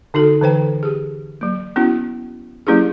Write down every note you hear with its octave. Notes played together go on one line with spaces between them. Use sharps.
D3 D#4 F#4 A4
D3 E3 C5 G5
G4 G#4
F#3 A#3
B3 C#4 E4 F#4
F#3 A#3 C#4 E4 G4 G#4